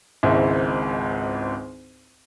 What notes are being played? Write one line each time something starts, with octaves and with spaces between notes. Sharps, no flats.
G#1 C#2 G#2 E4 E5